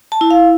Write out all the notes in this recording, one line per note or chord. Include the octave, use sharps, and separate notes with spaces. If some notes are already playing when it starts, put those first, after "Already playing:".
A5
E4
F5